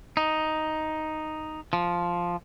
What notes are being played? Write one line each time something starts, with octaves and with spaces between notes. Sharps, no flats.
D#4
F3